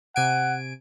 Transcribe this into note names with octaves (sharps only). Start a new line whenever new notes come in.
C3 F#5 G#5 D7